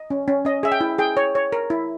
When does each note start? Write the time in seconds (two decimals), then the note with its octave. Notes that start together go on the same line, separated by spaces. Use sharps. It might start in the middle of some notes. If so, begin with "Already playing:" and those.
Already playing: D#5
0.10 C#4
0.28 C#4
0.45 C#4 D#5
0.63 G#4 E5
0.72 G5
0.81 E4
0.98 G#4 G5
1.17 C#5
1.35 C#5
1.52 A#4
1.70 E4